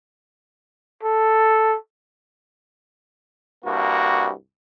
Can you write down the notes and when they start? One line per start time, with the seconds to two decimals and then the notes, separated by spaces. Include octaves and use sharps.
1.03 A4
3.65 C2 G2 A#3 F#4